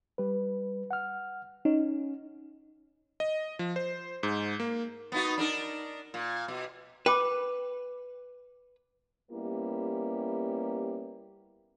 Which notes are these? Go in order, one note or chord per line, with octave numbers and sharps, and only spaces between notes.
G3 B4
F#5 F6
C#4 D#4
D#5
F3
C5
G#2
A#3
B3 D#4 F#4
D4 D#4 A#4
A#2
B2
B4 G5 D6
G3 A#3 B3 C#4 E4 G4